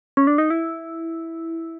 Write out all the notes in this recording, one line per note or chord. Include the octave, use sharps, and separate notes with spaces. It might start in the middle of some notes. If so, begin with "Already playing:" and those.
C#4
D4
D#4
E4